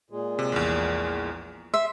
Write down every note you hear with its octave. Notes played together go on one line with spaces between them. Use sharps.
A#2 G#3
C3
A#1 E2
E5 C6